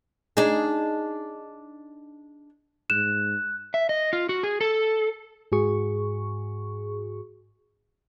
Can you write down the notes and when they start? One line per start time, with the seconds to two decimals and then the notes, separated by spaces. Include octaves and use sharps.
0.37 D4 D#4 G#4
2.90 G#2 F#6 E7
3.74 E5
3.89 D#5
4.13 F4
4.29 F#4
4.43 G#4
4.61 A4
5.52 G#2 F#4 G#4 C#6